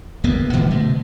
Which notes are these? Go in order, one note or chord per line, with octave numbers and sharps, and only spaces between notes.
D1 D2 A#3 B3
A#2 E3 G3 A3
G2 B2 D3 A3